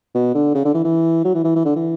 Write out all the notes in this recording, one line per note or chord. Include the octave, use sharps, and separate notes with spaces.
B2
D3
C#3
D3
E3
E3
F#3
E3
E3
E3
D3
E3